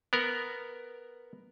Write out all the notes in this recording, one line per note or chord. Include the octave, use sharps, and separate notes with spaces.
B3 A#4